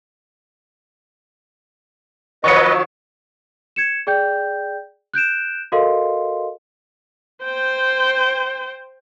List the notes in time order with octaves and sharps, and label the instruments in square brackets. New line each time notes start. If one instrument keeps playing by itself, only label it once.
[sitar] D#3 F3 F#3 [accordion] B4 D#5 [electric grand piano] C#6 C#7
[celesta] G#6 C#7 E7
G#4 D5 G5 G6
F#6 G6 D7 E7
F#4 A4 A#4 D#5 F5 C6
[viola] C5 G5